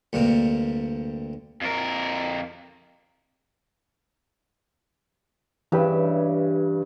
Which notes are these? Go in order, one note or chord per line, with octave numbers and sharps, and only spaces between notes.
D2 G2 C3 A#3
F2 A#4
G2 C#3 E3 G4 B4 E5